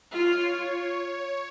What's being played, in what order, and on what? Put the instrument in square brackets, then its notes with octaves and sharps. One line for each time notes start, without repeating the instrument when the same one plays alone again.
[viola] F4 [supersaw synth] C#5